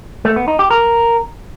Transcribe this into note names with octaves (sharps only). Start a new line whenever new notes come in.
A3
B3
D#4
G4
A#4